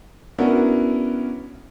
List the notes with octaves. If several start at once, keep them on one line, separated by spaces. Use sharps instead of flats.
B3 C#4 D4 E4 F#4 A#4